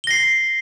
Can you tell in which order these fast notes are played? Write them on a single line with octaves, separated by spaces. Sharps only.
G7 A#6 C7